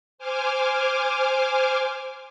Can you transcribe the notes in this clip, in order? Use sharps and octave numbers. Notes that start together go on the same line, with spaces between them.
C5 G#5 D6 F6